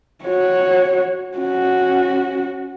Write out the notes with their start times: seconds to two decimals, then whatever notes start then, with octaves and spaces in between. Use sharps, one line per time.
0.25 F#4 C#5
1.38 C#4 F#4